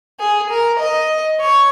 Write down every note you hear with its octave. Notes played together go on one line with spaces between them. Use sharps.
G#4
A#4
D#5
C#5